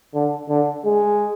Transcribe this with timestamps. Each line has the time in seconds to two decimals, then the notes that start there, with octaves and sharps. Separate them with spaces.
0.14 D3
0.49 D3
0.85 G#3